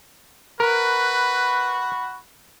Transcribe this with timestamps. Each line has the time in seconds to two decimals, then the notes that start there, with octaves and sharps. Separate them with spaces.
0.60 F#4 A#4 B4 B5